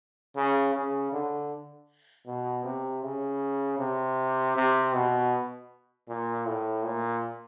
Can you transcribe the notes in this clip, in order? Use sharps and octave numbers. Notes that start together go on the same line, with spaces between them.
C#3
C#3
D3
B2
C3
C#3
C3
C3
B2
A#2
A2
A#2